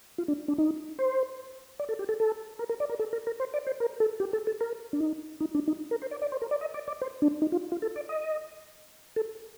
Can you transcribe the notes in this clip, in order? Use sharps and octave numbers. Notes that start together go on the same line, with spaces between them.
F4
D4
D4
D#4
C5
D5
A4
G4
A4
A4
A#4
A#4
D5
A#4
A4
A#4
A#4
C5
D5
C5
A#4
A4
G4
A4
A4
A#4
D4
D#4
D#4
D4
D#4
A#4
C5
D5
D5
C5
A#4
D5
D#5
D5
D5
C5
D4
D#4
F4
F4
A4
D5
D#5
A4